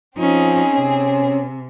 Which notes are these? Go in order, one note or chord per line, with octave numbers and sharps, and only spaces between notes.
F3 C4 C#4 D#4 G#4
C3 C#4